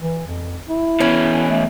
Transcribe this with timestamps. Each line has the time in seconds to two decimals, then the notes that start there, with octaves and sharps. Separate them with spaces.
0.01 E3
0.27 F2
0.69 E4
1.00 B2 E3 C#4
1.48 A3